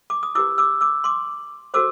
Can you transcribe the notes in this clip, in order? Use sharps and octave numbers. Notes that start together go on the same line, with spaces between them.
D6
D#6
E4 G4 B4 D6 E6
D6 E6
D6 E6
C6 D6
F#4 A4 C5 D6 E6